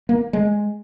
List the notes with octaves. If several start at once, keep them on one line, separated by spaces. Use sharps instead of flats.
A#3
G#3